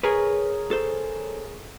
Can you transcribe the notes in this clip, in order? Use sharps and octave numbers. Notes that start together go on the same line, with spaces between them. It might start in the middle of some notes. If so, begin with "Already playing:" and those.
G#4 A#4 B4 C#5
A4 C5